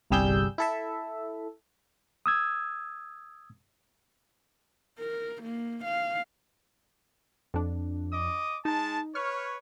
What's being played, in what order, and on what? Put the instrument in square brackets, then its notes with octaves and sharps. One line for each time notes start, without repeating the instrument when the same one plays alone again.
[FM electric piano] G1 C2 G3 G#4 E6 G6
E4 A4 E5
[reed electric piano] D#6 E6 G#6
[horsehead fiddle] A#4
A#3
F5
[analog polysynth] F2 D4
[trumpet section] D#5 D6 D#6
[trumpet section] G#3 A5 [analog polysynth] D#4
[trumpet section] B4 C#5 [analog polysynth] C#6 F6